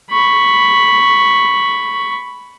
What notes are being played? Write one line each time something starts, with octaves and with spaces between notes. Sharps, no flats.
B5 C#6